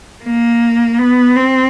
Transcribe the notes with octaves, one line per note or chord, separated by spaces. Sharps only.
A#3
B3
C4